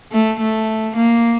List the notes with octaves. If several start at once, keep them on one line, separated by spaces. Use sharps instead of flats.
A3
A3
A#3